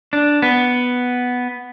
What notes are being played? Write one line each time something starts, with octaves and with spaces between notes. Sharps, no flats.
D4
B3